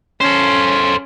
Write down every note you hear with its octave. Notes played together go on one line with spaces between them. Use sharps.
C#4 A4 C5